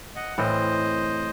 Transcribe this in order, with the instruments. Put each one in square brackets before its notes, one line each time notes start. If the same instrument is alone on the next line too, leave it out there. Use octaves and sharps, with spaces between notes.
[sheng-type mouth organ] D#5 F#5
[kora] A2 E3 C4 [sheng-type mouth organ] C5 D#5